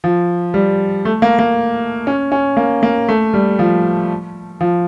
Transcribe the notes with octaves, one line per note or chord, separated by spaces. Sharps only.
F3
G3
A3
A#3
A#3
C#4
C#4
A#3
A#3
A3
G3
F3
F3